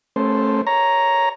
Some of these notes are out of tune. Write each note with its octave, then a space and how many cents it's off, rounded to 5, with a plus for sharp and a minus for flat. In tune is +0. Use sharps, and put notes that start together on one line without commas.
A3 -10 C#4 -35 C5 +0
C#5 +0 A#5 +0